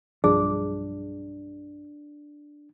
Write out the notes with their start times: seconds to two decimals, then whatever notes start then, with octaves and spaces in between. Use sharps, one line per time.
0.24 B1 G2 F3 D4 G#4